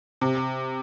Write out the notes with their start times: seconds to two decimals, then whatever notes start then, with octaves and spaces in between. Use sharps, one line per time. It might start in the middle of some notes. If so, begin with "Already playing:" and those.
0.21 C3